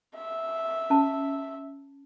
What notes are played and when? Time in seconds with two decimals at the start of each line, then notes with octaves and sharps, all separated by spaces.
0.15 E5
0.90 C#4 A5